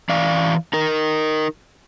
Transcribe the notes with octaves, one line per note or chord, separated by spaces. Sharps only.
E3 D5 F5
D#4 A#4